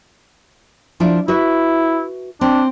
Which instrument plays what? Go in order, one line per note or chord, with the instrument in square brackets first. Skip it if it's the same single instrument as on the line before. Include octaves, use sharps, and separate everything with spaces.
[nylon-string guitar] F3 D4 E4
[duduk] E4 [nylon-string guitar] F#4 B4 E5
[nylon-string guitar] C4 [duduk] D4